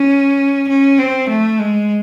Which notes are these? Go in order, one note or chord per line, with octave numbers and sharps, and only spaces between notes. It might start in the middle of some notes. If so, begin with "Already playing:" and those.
Already playing: C#4
C#4
C4
A3
G#3